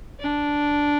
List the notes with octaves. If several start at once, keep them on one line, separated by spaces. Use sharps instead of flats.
D4